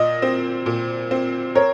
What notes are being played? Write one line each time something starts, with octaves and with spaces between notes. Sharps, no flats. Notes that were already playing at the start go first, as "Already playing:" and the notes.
Already playing: A#2 D#5
C4
A#2
C4
A#4 C#5